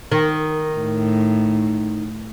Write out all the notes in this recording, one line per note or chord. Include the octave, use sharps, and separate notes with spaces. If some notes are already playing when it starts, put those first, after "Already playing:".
D#3
A2